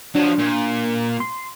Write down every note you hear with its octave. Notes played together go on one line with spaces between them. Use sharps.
F3 F#3 D4
A#2
C6